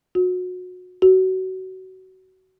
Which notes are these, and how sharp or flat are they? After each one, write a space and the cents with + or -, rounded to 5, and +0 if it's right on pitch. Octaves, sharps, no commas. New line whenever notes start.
F#4 -30
F#4 +25